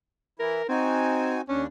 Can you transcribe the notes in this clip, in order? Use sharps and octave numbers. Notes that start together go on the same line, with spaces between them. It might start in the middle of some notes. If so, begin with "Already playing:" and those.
E3 E4 A#4
C4 D#4 F#4 G#5
D#2 C#4 D4